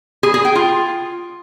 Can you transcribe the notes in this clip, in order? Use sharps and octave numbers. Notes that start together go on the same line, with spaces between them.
G#4
G#4
G5
F4